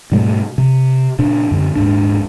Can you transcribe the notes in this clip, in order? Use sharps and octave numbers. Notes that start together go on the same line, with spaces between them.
G#2 B2 G3 A3
C3
A#2 C#3 D4
F#2 D3
D#1 G#2 D4